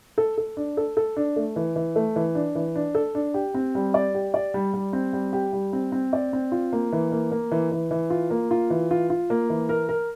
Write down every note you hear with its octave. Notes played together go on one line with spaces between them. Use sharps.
A4
A4
D4
A4
A4
D4
A3
E3
E3
A3
E3
D4
E3
D4
A4
D4
G4
C4
G3
D5
G4
D5
G3
G3
C4
G3
G4
G3
C4
C4
D5
C4
F4
A#3
E3
A#3
A#3
E3
E3
E3
F4
A#3
F4
E3
F4
F4
A#3
E3
A#4
A#4